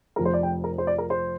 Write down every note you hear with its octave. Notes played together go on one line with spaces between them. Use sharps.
F1 F2 F3 A#4
C5
D5
G5
A#4
C5
D5
A#4
C5